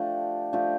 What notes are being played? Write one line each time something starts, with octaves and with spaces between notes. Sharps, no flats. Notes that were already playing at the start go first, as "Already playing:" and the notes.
Already playing: F3 A3 D4 G4
F3 A3 D4 G4